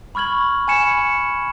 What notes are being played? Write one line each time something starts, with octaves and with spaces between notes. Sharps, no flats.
B5 C#6 F6 G#6 F#7
G#5 B5 G#6 C#7 E7